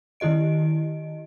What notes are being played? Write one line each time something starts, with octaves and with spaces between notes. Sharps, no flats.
D#3 E4 G4 D#5 D7